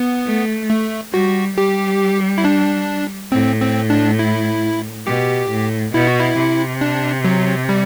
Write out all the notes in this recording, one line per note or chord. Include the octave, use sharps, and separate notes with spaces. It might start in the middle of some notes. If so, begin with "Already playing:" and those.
Already playing: B3
A3
A3
G3 F#4
G3 G4
E4
D4
A2 C4
C4
D4
E4
B2 G4
A2
B2 E4
F#4
E4
C3
D4
F#3
G3